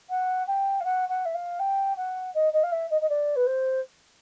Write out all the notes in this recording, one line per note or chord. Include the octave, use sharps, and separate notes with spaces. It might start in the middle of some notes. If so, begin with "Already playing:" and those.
F#5
G5
F5
F#5
F#5
E5
F5
G5
F#5
D#5
D#5
F5
E5
D#5
D#5
D5
B4
C5